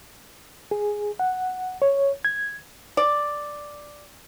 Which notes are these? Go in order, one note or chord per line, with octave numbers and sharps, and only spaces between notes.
G#4
F#5
C#5
G#6
D5